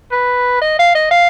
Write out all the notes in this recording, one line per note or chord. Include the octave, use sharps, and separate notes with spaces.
B4
D#5
F5
D#5
F5